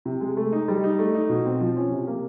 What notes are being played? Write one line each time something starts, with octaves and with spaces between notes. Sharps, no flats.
C3
G#3
A3
D#4
G3
D#4
A3
D#4
B2
C4
F3
C#4
C3
A#3